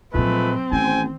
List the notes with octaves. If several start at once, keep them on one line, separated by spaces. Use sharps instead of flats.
A#2 F3 F#3 G#3 A3 C4 B4
A1 D#3 C5 G5 G#5